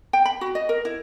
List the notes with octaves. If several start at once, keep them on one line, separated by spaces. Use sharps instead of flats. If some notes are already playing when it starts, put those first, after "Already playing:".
G5
B5
F#4
D#5
A#4
E4